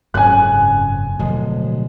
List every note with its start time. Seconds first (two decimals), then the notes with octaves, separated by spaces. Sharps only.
0.14 F#1 F2 G#2 C#3 G#5 F#6
1.19 D1 B2 F3 G#3